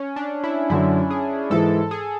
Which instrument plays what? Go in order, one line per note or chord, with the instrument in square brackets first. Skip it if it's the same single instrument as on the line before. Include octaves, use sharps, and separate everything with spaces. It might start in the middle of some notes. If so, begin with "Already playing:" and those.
Already playing: [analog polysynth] C#4
D4
E4
[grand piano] F#2 D3 F#3 [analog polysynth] E4
[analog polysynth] G#4
[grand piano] G#2 E3 G#3 [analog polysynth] A4
[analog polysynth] G#4